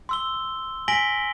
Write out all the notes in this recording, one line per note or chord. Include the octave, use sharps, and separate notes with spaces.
C6 E6 G7
G#5 A#6 B6 D7 F#7 G7